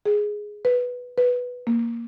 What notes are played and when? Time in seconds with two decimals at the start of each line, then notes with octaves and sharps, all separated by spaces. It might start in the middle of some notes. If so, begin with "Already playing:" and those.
0.05 G#4
0.65 B4
1.18 B4
1.67 A#3